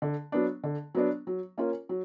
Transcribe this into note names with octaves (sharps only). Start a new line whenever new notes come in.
D3
F#3 B3 D4
D3
F#3 B3 D4
F#3
A#3 C#4 F4 A#4
F#3